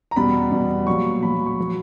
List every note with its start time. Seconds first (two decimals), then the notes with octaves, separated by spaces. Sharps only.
0.11 A#5
0.16 E2 B2 G3 B5
0.52 E2 B2 G3
0.87 A#2 F#3 C#6
1.22 A#2 F#3 B5
1.46 C#6
1.60 F#3